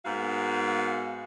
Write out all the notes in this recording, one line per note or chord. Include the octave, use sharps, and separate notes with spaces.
G#2 A#3 B3 F#4 F5